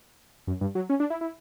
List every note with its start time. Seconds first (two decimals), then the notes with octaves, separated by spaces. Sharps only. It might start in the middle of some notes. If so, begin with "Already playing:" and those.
0.47 F#2
0.61 G2
0.75 F#3
0.90 C#4
1.00 D4
1.10 E4
1.21 E4